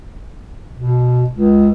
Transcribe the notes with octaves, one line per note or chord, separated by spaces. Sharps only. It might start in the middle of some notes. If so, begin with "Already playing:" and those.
B2
C#2